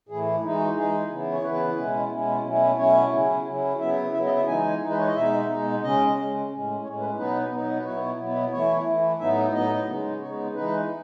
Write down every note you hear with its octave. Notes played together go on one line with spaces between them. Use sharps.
A2 E3 A3 E4 G#4
E3 G#3 D#4 E4
F#4
E3 G#3 D#4 G#4
C#3 E3 B3 E4
C#5
C#3 E3 B3 E4 B4
B2 G#3 C#4 E4
B2 G#3 C#4 E4
B2 F#3 A3 C#4 E4
B2 F#3 A3 C#4 E4 C#5
C#3 F#3 C#4 E4
C#3 F#3 C#4 E4
C#3 F#3 B3 E4 E5
C#3 F#3 B3 E4 E5
D#5
E5
E3 G#3 D#4 G#5
E3 G#3 D#4
B4
C#5
D#5
B2 G#3 D#4 E5
B2 G#3 D#4
C#3 G#3 C#4 D#5
C#3 G#3 C#4
A2 G#3 C#4
A2 G#3 C#4 C#5
B4
B2 F#3 B3 D#4 B4
B2 F#3 B3 D#4
B4
B2 F#3 B3 E4 C#5
B2 F#3 B3 E4
E3 A3 E4 C#5
E3 A3 E4
A2 F#3 B3 D#4 E5
A2 F#3 B3 D#4 D#5
C#3 G#3 B3 D#4
C#3 G#3 B3 D#4 C#5
E3 G#3 D#4 B4